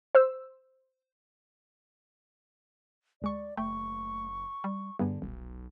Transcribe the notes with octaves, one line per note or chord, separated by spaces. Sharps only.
C5 E6
D2 G#3 D5 C#6
F#1 A3 G5 C#6
G3
G2 D3 G3 B3 G#4
D#1 B1